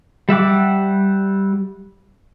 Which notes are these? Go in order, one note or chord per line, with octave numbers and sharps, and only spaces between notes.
G3 E5 F#5 D6